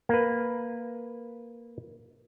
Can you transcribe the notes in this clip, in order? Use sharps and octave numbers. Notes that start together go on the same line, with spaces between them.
A#3 B4